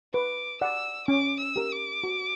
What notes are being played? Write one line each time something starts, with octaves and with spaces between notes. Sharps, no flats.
B4 D6
D5 F#5 E6
C#4 D6
E6
G4 A#4
D6
F#4